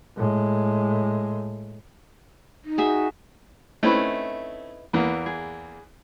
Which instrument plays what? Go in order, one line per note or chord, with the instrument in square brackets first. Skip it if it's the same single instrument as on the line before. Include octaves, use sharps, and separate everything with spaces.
[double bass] A2 G#3
[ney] D#4
[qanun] F#4 G#4 E5
[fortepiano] A3 C4 C#4 [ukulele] D#4 E4 B4
[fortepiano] E2 E3 A#3
[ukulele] G#4